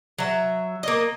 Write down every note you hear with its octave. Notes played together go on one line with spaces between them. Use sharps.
F#3 E5
A#3 D#5